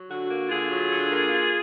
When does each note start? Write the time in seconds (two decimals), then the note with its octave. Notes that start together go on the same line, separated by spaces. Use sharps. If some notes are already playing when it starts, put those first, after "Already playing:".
Already playing: F#3
0.09 D3 F#4
0.30 A#3
0.49 D3 F4 G#4
0.70 F#3
0.90 D3
1.11 A#3
1.31 F4